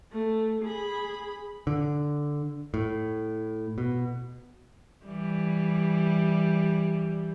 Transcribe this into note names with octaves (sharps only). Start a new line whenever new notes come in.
A3
G#4 B5
D3
A2
B2
E3 G3